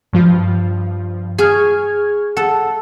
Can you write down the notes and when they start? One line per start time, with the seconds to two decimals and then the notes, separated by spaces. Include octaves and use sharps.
0.13 G2 F3 F4
1.39 G#4 C#6 F6 G#6
2.37 A4 F#5